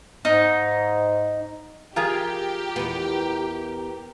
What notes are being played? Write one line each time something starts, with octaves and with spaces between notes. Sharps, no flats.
G#2 D#4
F3 F4 G4 G#4 A#4
E2 B3